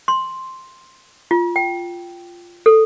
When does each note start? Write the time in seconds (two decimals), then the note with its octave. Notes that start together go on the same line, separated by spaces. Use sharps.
0.08 C6
1.31 F4
1.56 G5
2.66 A4